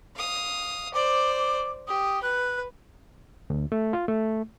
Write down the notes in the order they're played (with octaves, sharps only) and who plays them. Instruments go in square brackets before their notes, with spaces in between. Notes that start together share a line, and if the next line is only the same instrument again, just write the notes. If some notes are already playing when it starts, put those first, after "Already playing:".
[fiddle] F5 D#6
[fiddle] C5 D5 [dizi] D6
[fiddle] G4 [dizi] D#6
[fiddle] B4 [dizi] F#6
[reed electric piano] D2
A3
F4
A3